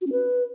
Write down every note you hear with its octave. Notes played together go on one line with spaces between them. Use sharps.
F#4
C#4
B4